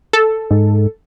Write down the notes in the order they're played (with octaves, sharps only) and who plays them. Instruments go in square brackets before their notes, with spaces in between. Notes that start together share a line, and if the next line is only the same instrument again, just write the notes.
[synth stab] A4
[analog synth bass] G#2